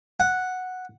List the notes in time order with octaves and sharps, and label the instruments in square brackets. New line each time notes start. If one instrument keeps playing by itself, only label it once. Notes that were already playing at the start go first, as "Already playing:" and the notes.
[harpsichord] F#5